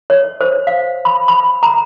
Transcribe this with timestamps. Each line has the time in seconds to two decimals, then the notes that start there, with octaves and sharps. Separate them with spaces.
0.10 C#5
0.41 C5
0.67 F5
1.05 B5
1.28 B5
1.63 A#5